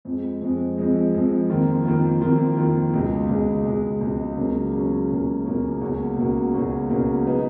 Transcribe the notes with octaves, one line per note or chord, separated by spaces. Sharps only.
F2 F3 G#3
F2 F3 G#3
F2 F3 G#3
F2 F3 G#3
F2 D#3 A#3 F4
F2 D#3 A#3 F4
F2 D#3 A#3 F4
F2 D#3 A#3 F4
C#2 B2 G#3
C#2 B2 G#3
C#2 B2 G#3
C#2 B2 G#3
C#2 B2 F#3 A#3 C#4
C#2 B2 F#3 A#3 C#4
C#2 B2 F#3 A#3 C#4
C#2 B2 F#3 A#3 C#4
C#2 B2 A#3 C#4 F#4
C#2 B2 A#3 C#4 F#4
C#2 B2 A#3 C#4 F#4
C#2 B2 A#3 C#4 F#4
F#3 B3 D#4 G#4